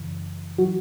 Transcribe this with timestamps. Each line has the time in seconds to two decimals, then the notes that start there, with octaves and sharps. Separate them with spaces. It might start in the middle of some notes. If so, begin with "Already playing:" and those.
Already playing: F#2 C#3 E3
0.58 E3 F#3 F#4